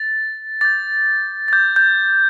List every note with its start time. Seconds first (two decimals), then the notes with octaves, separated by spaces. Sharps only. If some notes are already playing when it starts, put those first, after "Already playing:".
Already playing: A6
0.61 D6 G6 A6
1.48 A6
1.53 D6 G6
1.76 G6